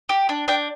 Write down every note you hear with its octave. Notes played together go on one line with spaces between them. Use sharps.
G4
D4
D4 G5